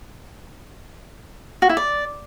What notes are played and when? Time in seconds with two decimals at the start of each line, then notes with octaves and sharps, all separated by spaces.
1.62 F#4
1.69 E4
1.77 D5